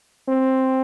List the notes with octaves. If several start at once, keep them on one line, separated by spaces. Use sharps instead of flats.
C4